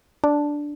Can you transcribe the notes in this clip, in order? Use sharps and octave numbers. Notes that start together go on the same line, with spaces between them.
D4